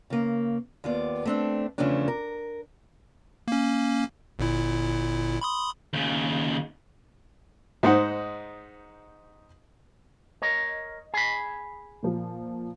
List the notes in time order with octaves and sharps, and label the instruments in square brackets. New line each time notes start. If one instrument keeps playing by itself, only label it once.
[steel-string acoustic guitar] C#3 A#3
D#2 B3 F4 D5
A3 C4 D4
E2 C#3 F3 A3 C#4 D4
A#4
[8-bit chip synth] A#3 C#4
G1 A#2 E4
B5 C6 D#6
[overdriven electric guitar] D#2 C#3
[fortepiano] G#2 D#4 C5 F#5
[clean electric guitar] A#4 C#5 [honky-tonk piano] D#5
[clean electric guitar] G#4 B5
[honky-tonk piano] A#2 F3